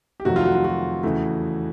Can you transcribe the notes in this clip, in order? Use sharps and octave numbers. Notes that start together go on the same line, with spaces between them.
G4
F2 C3 D#3 F#3 A3 F#4
F4
F#4
F4
F#4
E2 C#3 E3 A3